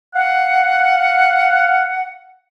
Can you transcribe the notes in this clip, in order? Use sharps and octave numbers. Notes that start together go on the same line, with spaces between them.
F5 F#5